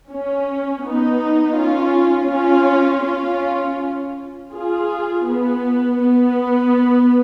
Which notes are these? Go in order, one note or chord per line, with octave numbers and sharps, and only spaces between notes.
C#4
B3 D#4
C#4 F4
C#4 F4
C#4 F4
F4 G#4
B3
B3